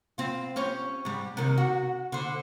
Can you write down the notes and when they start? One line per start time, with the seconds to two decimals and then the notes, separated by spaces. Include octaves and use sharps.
0.18 C4 F4
0.56 C#4 G4 C#5
1.05 G#2 G3
1.37 C3 D#3 D#4
1.58 F#4
2.12 D3 C5